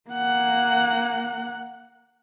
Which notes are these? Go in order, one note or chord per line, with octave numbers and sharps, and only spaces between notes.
A#3 F#5